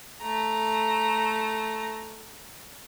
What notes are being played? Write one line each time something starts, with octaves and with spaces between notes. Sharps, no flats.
A3 A#5